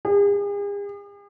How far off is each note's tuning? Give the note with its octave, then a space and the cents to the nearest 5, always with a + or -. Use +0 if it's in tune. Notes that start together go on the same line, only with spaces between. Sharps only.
G#4 -45